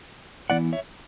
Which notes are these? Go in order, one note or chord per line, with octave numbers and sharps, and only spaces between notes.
E3 B3 E4 D5 F#5
C#5 E5